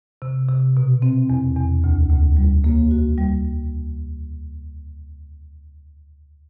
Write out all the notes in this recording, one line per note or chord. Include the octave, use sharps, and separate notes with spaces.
C3
C3
B2
C4
E2
E2
D2
D2
G3
A#3
F#4
G3